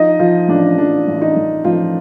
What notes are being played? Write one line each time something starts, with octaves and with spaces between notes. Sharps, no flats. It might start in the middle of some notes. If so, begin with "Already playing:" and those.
Already playing: F3 D#4 D#5
F3 F4
A1 D4
F3 D4
A1
D#4
A1
A1 F3 F4